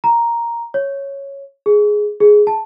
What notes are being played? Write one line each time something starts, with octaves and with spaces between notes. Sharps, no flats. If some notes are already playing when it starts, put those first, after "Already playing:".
A#5
C#5
G#4
G#4
A5